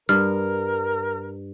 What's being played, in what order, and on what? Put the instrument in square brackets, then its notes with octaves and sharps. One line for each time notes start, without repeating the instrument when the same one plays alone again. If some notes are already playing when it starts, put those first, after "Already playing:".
[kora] G2 [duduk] A#4 [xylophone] F6